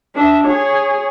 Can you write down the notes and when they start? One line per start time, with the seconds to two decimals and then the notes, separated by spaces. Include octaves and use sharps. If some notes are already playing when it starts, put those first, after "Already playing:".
0.15 D4 E5
0.46 G#4 C#5